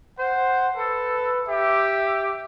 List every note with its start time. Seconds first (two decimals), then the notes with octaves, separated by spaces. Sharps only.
0.19 C5 F#5
0.77 A4 B4
1.48 G4 E5